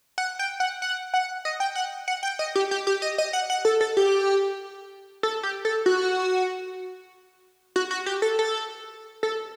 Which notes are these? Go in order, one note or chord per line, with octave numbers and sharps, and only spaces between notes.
F#5
G5
F#5
F#5
F#5
D#5
G5
F#5
F#5
G5
D#5
G4
G4
G4
D#5
D#5
F#5
F#5
A4
A4
G4
A4
G4
A4
F#4
F#4
F#4
G4
A4
A4
A4